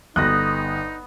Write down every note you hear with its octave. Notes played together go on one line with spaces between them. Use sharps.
G1 B3 D#4 D#6 F#6 A#6